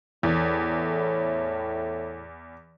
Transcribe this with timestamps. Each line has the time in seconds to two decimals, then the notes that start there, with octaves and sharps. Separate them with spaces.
0.23 E2 A2